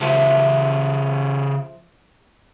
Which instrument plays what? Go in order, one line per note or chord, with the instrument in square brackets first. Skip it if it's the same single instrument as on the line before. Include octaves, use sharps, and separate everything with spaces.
[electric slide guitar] C#3 G4 A4 [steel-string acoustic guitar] F3 E5